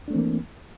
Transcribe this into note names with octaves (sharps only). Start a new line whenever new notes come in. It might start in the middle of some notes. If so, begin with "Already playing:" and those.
E3 A3 A#3 C4 D4